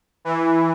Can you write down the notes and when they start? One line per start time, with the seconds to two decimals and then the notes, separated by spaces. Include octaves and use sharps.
0.25 E3